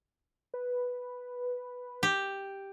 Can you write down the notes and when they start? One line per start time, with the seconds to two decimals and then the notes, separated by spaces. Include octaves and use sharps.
0.54 B4
2.03 G4